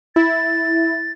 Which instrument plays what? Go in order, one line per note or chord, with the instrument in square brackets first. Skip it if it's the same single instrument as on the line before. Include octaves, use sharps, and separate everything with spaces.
[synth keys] E4 [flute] A6